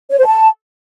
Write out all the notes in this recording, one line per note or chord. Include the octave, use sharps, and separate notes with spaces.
C#5
C5
A5